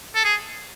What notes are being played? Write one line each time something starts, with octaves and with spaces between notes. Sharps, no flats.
A4
G#4